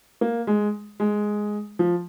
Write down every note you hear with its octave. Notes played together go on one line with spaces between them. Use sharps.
A#3
G#3
G#3
F3